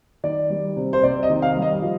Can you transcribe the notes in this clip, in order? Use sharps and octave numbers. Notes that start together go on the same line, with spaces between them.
D#3 D5
G3
C3
C5
C3 D5
D#5
D#3
F5
G3
D#5
F3